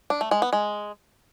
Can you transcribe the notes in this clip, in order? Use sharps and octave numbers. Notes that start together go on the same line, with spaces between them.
D4
A3
G#3
B3
G#3